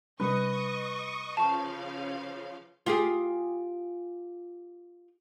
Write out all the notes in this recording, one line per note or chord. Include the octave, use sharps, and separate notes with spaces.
C3 G3 D4 B4 D#5 C#6 D#6
C#3 F3 F5 A5 C#6
F4 G4 G#4